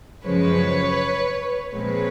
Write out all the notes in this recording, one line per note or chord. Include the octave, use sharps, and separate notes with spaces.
F#2 C#3 F3 G#3 B4 C#5
A#2 F3 G#3 C4 B4 C#5